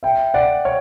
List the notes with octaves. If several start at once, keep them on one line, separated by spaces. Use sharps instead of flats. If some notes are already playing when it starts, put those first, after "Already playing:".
E5 G5
D5 F#5
C#5